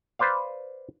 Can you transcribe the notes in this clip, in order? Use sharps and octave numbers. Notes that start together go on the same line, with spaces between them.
B4 C5 D5 F5